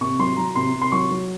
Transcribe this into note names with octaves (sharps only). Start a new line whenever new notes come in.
C3 C#6
F#3 C6
F#3 A#5
C3 C6
C3
C6
F#3 C#6
F#3